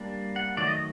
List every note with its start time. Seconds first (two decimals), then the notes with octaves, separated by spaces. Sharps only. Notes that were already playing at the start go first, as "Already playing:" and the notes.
Already playing: G3 A#3 D4
0.36 F#5
0.57 D#3 F#3 A3 D5
0.67 D#5